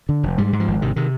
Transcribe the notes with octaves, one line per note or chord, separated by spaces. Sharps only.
D3
F1
G#2 G3
G#2
F3
G#1
C3 D#3
C3 D#3